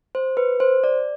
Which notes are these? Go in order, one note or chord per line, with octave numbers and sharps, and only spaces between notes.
C5
B4
C5
D5